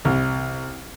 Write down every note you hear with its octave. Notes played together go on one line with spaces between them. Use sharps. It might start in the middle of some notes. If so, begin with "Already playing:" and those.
C2